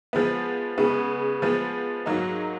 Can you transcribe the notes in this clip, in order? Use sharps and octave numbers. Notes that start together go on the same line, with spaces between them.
F3 G#3 B3
C#3 G#3 B3
F3 G#3 B3
G#2 F#3 A#3 D#4